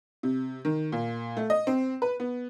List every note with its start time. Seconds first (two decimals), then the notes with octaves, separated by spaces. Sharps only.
0.23 C3
0.65 D#3
0.92 A#2
1.37 A3
1.50 D#5
1.67 C4
2.02 B4
2.20 B3